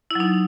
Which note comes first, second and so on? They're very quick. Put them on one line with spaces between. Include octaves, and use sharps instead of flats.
E4 F#3 D#4